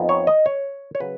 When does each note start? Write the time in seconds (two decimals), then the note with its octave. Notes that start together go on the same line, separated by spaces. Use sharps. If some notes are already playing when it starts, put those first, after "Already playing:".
Already playing: F2 F3 B3 D#4
0.09 C#5
0.27 D#5
0.46 C#5
0.95 C#5
1.00 C#3 F#3 B4